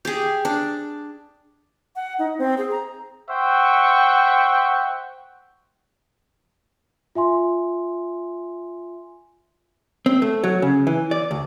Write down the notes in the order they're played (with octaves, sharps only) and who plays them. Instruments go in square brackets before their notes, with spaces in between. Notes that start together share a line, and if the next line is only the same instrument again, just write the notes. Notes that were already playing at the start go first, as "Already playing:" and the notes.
[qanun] G4 G#4
D4
[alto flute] F#5
D#4
C4
G#4
A#5
[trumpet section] C5 E5 F#5 G5 C#6
[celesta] F4 E5 G#5 C6
[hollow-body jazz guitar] C4
A3
F#3
C#3
E3
D5
D2